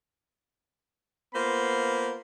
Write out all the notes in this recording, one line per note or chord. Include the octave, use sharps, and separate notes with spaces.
A#3 B3 F4 C5 B5